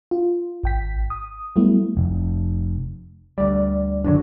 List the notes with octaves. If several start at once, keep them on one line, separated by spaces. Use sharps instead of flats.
F4
G#1 G5 B6
D#6
F#3 G3 A3 B3 E4
F1
D2 G3 D5
F#1 A2 D3 F#3 D4